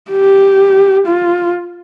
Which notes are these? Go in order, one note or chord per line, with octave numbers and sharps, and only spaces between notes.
G4
F4